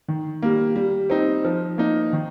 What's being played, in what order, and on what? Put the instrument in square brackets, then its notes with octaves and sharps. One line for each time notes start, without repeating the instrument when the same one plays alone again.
[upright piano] D#3
G3 A#3
G3
C4 D#4
F3
A#3 D#4
D#3